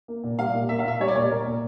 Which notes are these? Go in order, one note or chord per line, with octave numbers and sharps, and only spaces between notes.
A#3
A#2
G3 F5
A#2
A#3 E5
F5
A#2 E5
G3 C#5
D5
A#2 C#5
A#3 A#4
A#2